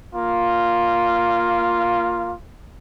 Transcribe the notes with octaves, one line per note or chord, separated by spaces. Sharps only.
A#3 F4